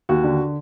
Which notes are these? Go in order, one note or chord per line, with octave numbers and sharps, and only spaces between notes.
D#2 F#4
D3